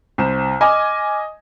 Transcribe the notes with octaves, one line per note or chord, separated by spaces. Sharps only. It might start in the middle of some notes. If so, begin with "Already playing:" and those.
C2 C5 E7
D#5 G#5 D6 F6